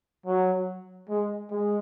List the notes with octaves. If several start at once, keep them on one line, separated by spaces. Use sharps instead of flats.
F#3
G#3
G#3